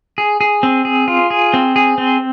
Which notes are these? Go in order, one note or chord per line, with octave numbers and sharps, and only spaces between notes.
G#4
G#4
C4
G#4
F4
G#4
C4
G#4
C4